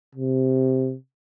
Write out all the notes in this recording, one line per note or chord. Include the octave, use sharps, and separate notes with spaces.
C3